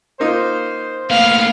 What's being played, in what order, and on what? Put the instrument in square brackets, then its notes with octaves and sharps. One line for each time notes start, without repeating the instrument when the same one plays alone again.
[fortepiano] A#3 D#4 F4 [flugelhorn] C5
[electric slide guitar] A3 A#3 B4 [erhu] F5